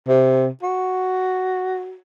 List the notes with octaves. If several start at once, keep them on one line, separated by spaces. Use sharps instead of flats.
C3
F#4